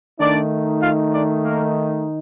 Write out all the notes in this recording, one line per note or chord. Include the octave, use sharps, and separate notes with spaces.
D#3 A3 D4 D#4 D5
F4 F5
D4 D5
A#3 A#4